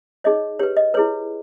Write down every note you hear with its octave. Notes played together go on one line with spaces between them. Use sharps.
D#4 G#4 C#5 D#5
G4 B4 C#5
D#5
E4 G#4 B4 C#5